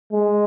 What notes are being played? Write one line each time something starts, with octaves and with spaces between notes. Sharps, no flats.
G#3